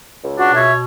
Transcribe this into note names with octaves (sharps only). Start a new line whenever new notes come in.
C#2
D4 F#4
B2
C#5 E5